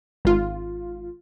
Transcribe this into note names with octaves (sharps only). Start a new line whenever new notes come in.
G#1 F4